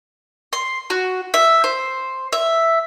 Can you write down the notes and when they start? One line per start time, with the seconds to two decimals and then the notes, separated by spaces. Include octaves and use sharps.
0.53 C6
0.90 F#4
1.34 E5
1.64 C5
2.33 E5